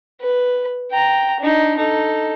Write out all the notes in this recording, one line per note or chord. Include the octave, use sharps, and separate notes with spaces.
B4
G5 A#5
D4 D#4
D#4 A4